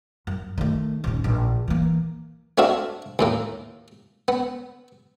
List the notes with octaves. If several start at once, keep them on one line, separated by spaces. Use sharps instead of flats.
F#2
D#3 A3
D#1 C#4
A#1
E3 A#3
A3 C4 D4 F#4 F5
D#2 A2 A#3
B3